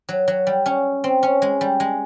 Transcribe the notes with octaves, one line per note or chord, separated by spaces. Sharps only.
F#3
F#3
G3
C#4
C4
C#4
G#3
G3
G#3